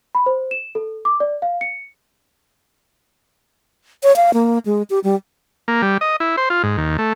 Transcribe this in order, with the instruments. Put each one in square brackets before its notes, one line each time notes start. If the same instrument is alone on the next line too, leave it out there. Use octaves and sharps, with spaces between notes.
[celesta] B5
C5
E7
A4
D6
D5
F5
C#7
[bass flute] C#5
F5
A#3
G#3
G4
G3
[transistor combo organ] A#3
G3
D#5
E4
C5
F4
G#2
D#2
A3